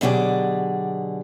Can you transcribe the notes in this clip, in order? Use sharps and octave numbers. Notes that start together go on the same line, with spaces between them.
B2 D3 F#3 G4 G#4 D5